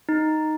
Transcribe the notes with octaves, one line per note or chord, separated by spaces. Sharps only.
D#4